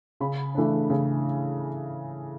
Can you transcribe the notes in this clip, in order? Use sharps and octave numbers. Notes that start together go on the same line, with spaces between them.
C#3 B5
E3 A3 D4
C#3